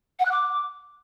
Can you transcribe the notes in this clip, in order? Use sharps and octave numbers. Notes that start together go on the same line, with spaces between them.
F#5
F#6
D6